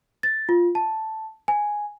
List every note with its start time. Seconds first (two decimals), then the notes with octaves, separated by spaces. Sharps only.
0.23 A6
0.49 F4
0.75 A5
1.48 G#5